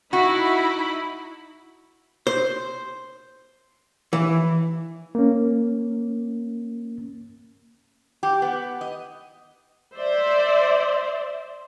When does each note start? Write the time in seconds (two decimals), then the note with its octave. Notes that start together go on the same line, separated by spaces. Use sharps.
0.13 D#4 E4 F#4 B5
2.27 C5
4.13 E3
5.15 A#3 C#4
8.23 G4
8.42 B3
8.81 D#5
9.96 C5 D5 E5